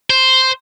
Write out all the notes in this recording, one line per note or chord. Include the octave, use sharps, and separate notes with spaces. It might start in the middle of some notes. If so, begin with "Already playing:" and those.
C5